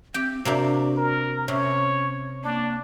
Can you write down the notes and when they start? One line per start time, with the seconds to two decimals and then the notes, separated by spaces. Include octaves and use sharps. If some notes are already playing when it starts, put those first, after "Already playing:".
0.14 C4 G4 G5
0.45 C3 A#3 D4 F#4
0.97 A#4
1.48 C3 C#4 C#5
2.44 A#3 D4